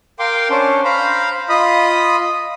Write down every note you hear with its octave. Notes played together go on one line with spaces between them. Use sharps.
A#4 F5 G5 C6 D6
C#4 D4 C5
C5 F5 A#5 B5
F4 D#5 B5 D#6